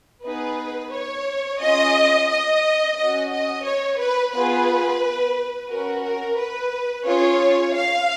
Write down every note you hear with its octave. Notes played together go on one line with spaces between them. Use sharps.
B3 D#4 G#4 B4
C#5
C#4 F4 G#4 D#5
D#5
C#4 F#4 D#5
D#5
C#5
B4
B3 F4 G#4 B4
C#4 F#4 A#4
A#4
B4
C#4 F4 G#4 C#5
F5